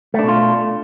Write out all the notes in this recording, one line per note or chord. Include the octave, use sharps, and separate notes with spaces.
B2 A3 D4 F4